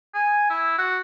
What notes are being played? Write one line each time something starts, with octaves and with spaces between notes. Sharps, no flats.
G#5
E4
F#4